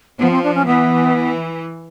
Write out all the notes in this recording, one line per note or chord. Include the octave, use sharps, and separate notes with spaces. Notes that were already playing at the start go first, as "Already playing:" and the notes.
F3 B3
C4
D4
C#4
E3 B3